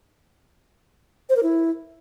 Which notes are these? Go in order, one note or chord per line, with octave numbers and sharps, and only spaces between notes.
C5
A#4
E4